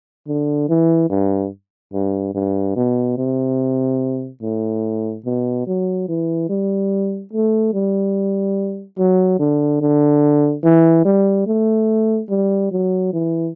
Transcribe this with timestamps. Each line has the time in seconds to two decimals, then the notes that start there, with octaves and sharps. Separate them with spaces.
0.27 D3
0.69 E3
1.10 G2
1.94 G2
2.35 G2
2.76 B2
3.18 C3
4.42 A2
5.26 B2
5.67 F#3
6.08 E3
6.49 G3
7.33 A3
7.74 G3
8.99 F#3
9.39 D3
9.81 D3
10.64 E3
11.05 G3
11.47 A3
12.30 G3
12.72 F#3
13.13 E3